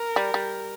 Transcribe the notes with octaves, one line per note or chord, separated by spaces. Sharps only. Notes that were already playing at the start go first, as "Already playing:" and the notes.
Already playing: A#4
G3
G3